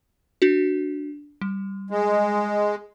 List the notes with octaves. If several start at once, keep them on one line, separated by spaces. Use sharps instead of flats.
D4 F#4
G3
G#3